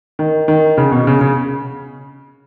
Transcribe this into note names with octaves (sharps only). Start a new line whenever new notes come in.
D#3
D#3
C#3
B2
C#3
C#3